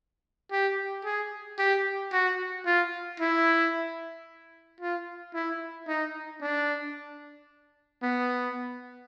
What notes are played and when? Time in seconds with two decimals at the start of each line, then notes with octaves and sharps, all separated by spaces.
0.52 G4
1.05 G#4
1.59 G4
2.12 F#4
2.66 F4
3.20 E4
4.81 F4
5.34 E4
5.88 D#4
6.42 D4
8.03 B3